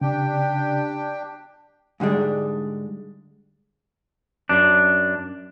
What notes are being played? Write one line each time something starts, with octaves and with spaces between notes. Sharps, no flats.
C#3 D4 G4 G5
G#2 D3 G3 G#3 D4
F#2 D4